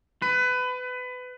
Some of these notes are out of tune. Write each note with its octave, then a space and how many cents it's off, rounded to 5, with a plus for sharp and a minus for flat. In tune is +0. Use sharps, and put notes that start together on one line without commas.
B4 +25